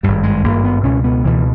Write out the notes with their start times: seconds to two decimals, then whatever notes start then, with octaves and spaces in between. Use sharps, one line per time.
0.03 G#1 G2 G3
0.23 G#3
0.44 G#1 G2 A#3
0.64 B3
0.83 C#2 B2 C#4
1.04 B3
1.24 C#2 B2 E3